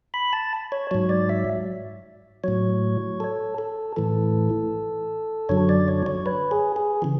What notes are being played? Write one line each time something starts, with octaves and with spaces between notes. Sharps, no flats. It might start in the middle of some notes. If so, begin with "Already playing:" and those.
B5
A5
C#5
G#2 F#3 C#5
D5
E5
A2 F#3 C#5
A4
A4
A2 E3 A4
F#2 D3 F#3 C#5
D5
C#5
C#5
B4
G#4
G#4
C#3 E3